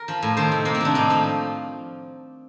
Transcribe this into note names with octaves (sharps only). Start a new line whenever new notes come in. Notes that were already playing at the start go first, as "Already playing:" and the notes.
Already playing: A#4
F3
A2
D#3 C5
C3
C3 A#3
C4
D#3 D4
A2 D#4
F3